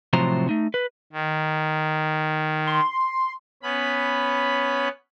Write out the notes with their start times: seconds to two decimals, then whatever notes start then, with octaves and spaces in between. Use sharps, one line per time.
0.13 A2 C3 F3 F#3 C5 A#5
0.49 A3 D#4
0.74 B4
1.13 D#3
2.67 C6
3.63 B3 C#4 B5